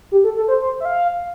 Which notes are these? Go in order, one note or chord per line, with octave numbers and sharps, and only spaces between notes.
G4
A4
A4
C5
C5
E5
F5